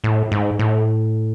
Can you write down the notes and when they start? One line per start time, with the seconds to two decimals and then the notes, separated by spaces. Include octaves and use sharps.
0.04 A2
0.32 G#2
0.59 A2